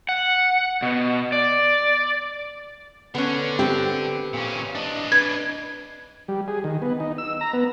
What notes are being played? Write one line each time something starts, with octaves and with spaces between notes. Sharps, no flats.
F#5
B2
D5
D3 B3 C#4
B3 C4 G4
A#2 C#4
D4 D#5
B4 G#6
G3
G#4
D#3
B3
D#4
E6
A#5
B3